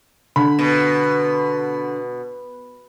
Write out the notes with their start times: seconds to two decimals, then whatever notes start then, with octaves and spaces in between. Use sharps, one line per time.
0.36 D3 B5
0.59 B2